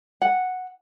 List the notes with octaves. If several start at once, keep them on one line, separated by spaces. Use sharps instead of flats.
F#5